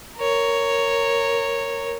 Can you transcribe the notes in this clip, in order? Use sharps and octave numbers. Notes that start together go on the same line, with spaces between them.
A#4 C#5